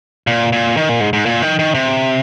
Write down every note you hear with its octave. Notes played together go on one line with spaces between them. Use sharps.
A#2
A#2
D#3
A#2
G#2
G#2
A#2
D#3
D#3
C3